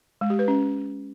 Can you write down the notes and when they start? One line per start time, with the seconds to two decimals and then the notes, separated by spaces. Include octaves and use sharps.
0.21 G#3
0.30 G4
0.39 B4
0.48 C#4